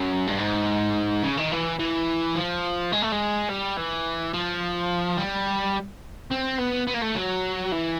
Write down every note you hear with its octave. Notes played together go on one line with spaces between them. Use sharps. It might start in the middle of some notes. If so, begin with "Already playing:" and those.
Already playing: F#2
G2
G#2
C#3
D#3
E3
E3
F3
G#3
A3
G#3
G3
E3
F3
G3
C4
B3
B3
A#3
A3
F#3
E3